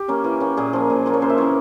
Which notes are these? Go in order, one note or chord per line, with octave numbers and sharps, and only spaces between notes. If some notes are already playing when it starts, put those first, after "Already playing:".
Already playing: G4
A#3 C#4
E3
A#3 C#4
A#2 G#4
F3 A#3
A#2
F3 A#3
C#5
C#3 C5
E5
E3 A#3 C#4 C#5